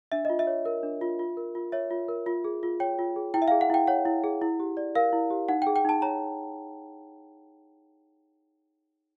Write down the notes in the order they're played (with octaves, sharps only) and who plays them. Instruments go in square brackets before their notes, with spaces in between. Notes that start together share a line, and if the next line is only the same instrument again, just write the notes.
[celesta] D4 E5
F4 D#5
E5
C#5
A#4
D4
F4
F4
A#4
F4
C#5 E5
F4
A#4
F4
G#4
F4
C#5 G5
F4
G#4
E4 G5
E5
G#4 F5
F#5
E4 G5
C#5 F#5
E4
G#4
E4
G4
D5
A#4 F5
E4
G4
D#4 F#5
G#4 G5
G5
D#4 A5
C#5 A#5